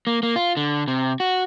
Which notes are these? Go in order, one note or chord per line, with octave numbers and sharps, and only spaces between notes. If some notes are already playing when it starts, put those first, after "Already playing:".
A#3
A#3
F4
D3
C3
F#4